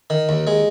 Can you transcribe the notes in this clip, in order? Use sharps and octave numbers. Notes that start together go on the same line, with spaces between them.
D#3
D#2
G#3